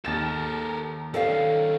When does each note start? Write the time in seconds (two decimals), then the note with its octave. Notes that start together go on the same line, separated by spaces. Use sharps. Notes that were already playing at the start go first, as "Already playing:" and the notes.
0.05 D#2 A4 A#4 A6 E7
1.14 D#3 C#4 A4 D5 F5